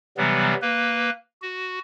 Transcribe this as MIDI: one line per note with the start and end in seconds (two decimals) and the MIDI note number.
0.17 0.54 48
0.17 0.54 52
0.17 0.54 54
0.17 0.54 55
0.17 0.54 59
0.62 1.10 58
0.62 1.10 71
1.42 1.79 66